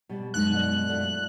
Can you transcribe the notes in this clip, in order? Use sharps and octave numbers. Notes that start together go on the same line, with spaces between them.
B2 G3
F#2 B2 F#3 G#3 D#4 F#6
D5 D#5 F#5
A3 F4 D5